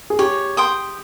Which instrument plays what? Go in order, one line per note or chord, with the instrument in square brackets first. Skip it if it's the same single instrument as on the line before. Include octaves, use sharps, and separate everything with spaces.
[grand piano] G#4
[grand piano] G4 [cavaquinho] C#5
[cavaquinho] G5 C6 D#6